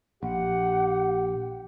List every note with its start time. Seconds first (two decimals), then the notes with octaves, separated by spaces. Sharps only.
0.23 A#1 G4 F#5